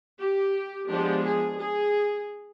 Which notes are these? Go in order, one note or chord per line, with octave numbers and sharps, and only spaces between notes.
G4
F3 G#3 B3 D4 G4
G#4
G#4